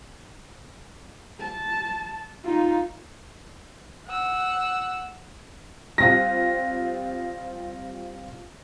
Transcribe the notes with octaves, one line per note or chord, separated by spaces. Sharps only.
A5
D#4 F4
F#5 E6
G3 C4 F4 A#6